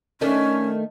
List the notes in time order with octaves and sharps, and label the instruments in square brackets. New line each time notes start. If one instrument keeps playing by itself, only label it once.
[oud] D#3 A3 D4 [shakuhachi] C#4